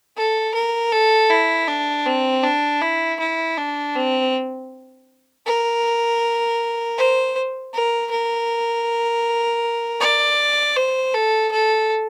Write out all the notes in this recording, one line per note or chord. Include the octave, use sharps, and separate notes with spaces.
A4
A#4
A4
E4
D4
C4
D4
E4
E4
D4
C4
A#4
C5
A#4
A#4
D5
C5
A4
A4